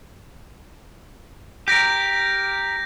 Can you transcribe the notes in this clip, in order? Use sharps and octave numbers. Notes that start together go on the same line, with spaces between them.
G4 A#4 G6 A#6